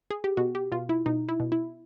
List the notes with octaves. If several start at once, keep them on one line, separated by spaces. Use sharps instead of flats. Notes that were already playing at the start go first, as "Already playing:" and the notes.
G#4
G4
B2 F#4
G4
B2 F4
E4
B2 D#4
E4
B2
E4